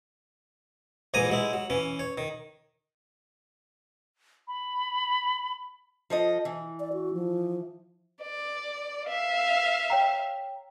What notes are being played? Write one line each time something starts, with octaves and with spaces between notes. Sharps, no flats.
A#1 G#2 E3 G#5 A#5 D#6
F#3 G#3 E4
F#3
E3 C#4
C#5
D#3
B5
F3 A4 D#5
E3
D5
F#4
F3
D5
E5 F5
C#5 G5 A#5